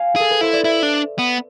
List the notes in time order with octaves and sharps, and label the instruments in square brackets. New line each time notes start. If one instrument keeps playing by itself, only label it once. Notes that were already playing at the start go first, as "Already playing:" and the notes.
Already playing: [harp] F5 G#5
[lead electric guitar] G#4 [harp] A4
[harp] B4
[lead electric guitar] E4 [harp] C5
[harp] D5
[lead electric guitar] E4 [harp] E5
[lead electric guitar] D4
B3